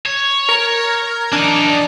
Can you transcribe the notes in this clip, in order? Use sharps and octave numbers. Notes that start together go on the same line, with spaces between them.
C#5
A#4
E3 D4 D#4